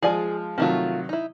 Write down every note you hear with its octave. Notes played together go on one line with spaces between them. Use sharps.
F3 G#3 G#4 D5 G#5
C3 D#3 F3 F#3 A3 F4
D#4 E4